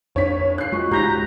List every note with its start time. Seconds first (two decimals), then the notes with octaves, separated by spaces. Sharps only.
0.16 F2 D4 C#5 B6
0.58 F#6 C7
0.72 G#3 F4 F#4 C#6
0.91 C#2 G#2 G4 A#5 F#6 G6 A#6 B6